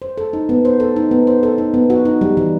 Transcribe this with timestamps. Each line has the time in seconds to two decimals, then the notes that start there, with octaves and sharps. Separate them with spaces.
0.02 C5
0.18 A4
0.33 D#4
0.49 B3
0.65 C5
0.80 A4
0.96 D#4
1.11 B3
1.27 C5
1.43 A4
1.58 D#4
1.74 B3
1.90 F#4
2.05 D#4
2.21 G3
2.37 E3